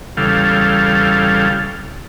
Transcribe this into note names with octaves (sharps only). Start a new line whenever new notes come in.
E2 C#3 G3 A4 F5